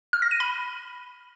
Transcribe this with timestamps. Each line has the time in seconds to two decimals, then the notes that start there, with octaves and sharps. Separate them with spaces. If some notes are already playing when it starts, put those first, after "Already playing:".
0.13 F6
0.22 A#6
0.31 D#7
0.40 B5